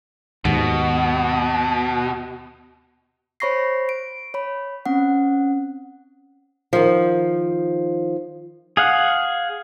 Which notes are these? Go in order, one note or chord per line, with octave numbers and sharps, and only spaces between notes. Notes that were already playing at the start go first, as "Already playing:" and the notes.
D#2 G#2 B2
C5 C#5 B5 C#6 A#6 C7
D7
C#5 B5
C4 C#4 F#5
D#3 F3
G#4 F5 F#5